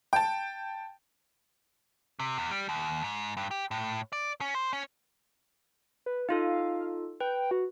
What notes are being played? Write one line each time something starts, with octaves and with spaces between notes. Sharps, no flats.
G5 A5
C3
E2
G3
D#2
G#2
G2
G4
A2
D5
C#4
C5
C#4
B4
D#4 F4 A4 F5
B4 G5
F#4